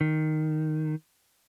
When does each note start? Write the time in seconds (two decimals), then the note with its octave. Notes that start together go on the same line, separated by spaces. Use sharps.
0.01 D#3